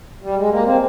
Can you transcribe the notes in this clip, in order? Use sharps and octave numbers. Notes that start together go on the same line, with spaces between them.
G3
G#3
A#3
C4